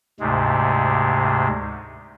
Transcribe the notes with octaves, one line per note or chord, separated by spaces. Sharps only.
D2 G#2 C3 G#3